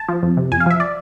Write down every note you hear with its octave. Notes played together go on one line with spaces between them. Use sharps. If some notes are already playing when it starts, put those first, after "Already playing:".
Already playing: A5
F3
F2
C3
F2 G#5
F5
F3 E5
D5